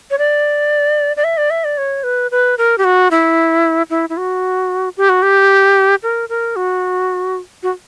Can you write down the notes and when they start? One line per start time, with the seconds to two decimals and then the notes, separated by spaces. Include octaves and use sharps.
0.11 C#5
0.18 D5
1.17 D5
1.24 E5
1.38 D5
1.50 E5
1.64 D5
1.78 C#5
2.04 B4
2.31 B4
2.58 A#4
2.78 G4
2.84 F#4
3.11 E4
3.90 E4
4.10 E4
4.17 F#4
4.97 G4
5.09 F#4
5.22 G4
6.03 A#4
6.29 A#4
6.56 F#4
7.63 F#4